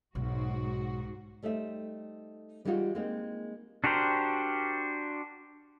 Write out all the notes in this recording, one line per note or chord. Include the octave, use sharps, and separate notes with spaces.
B1 G#2 F#4
G3 A3 D#4 C5 E5
E3 G3 G#3 D#4 F4 F#4
G#3 A#3 C4 D#4
D4 F#4 G4 A#4 C5